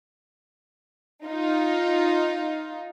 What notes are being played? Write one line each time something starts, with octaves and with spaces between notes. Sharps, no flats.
D#4 F4